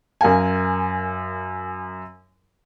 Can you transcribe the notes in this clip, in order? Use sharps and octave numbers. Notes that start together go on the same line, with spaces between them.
F#2 A#4 F5 G#5